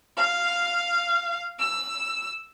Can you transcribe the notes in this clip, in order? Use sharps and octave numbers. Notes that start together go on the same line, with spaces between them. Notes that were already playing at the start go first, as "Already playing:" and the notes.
F5
E6